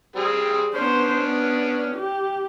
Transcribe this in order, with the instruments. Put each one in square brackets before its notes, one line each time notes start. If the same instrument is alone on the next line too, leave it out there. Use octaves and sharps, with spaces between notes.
[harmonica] G3 C4 G#4
[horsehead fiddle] B3 C5 [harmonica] C#4 D4
[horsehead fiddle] B3
G4